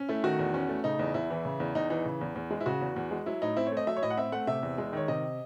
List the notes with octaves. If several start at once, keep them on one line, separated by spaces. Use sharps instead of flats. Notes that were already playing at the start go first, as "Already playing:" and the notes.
Already playing: C#4
A3 E4
D#3 F#4
E2
C#4
A3
C#3 D#4
E2
E2 E4
E3
C#3
E2
E2 D#4
E3 D#4
C#3
E2
E2
G#3
E4
C#3 F#4
E2
E2
G#3
F#3 E4
A2 D#4
C4 E4
C#5
A3
D#5
F#3 E5
C#5
A2 D#5
F#5
C4 E5
A3 F#5
C3 E5
E2
G#3
D#3 C#5
C3 D#5